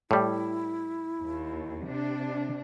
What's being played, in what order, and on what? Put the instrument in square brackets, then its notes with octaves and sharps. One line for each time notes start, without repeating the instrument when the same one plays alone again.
[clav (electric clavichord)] A2 G3 [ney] E4
[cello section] D#2
C3 D4